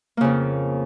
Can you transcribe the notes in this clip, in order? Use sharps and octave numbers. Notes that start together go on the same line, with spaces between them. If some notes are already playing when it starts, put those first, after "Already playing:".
F2 C#3 A#3